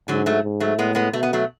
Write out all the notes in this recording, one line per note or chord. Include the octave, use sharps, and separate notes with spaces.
G#2 D3 F#3
F#3 A3
G#2
F#3 A3
A2 G#3 B3
G#3 B3
B2 A3
B3
F#3 A3